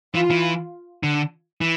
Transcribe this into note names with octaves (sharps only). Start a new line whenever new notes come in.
E3 F4
E3
D3
E3